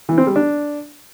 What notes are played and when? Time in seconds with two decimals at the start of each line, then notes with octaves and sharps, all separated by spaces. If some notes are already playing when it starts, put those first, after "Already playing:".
0.09 E3
0.18 C4
0.27 G3
0.36 D4